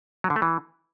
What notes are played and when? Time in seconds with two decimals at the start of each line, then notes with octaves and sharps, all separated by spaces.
0.24 F#3
0.30 D3
0.36 A3
0.42 E3